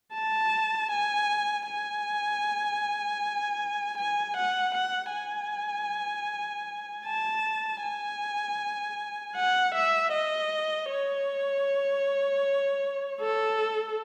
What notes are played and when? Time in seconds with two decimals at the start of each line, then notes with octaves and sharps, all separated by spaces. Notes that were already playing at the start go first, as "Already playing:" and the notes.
0.14 A5
0.91 G#5
1.68 G#5
3.98 G#5
4.37 F#5
4.75 F#5
5.14 G#5
7.06 A5
7.83 G#5
9.36 F#5
9.75 E5
10.12 D#5
10.90 C#5
13.21 A4